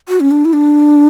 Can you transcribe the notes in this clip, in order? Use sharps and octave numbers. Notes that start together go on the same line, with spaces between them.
F#4
C#4
D4
E4
D4